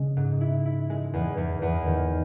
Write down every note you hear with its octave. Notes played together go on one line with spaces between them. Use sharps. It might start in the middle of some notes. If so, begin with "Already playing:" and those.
Already playing: C#3 G#3 C#4
G#2
E4
E4
G#3
E2
E2
E2
D#3